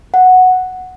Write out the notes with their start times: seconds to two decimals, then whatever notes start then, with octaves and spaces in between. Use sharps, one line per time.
0.14 F#5